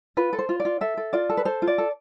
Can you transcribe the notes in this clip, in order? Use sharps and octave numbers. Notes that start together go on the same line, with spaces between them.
F4 B4
A4
C5
F4
D5
F4
A4 E5
A4
F4 D5
A4
B4
A4 C5
F4
D5
A4